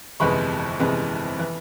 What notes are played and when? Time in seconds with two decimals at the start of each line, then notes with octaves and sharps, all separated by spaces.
0.20 G1 F2 C3 E3 G#3 B5 C#6
0.79 G1 F2 C3 E3 G#3
1.39 E3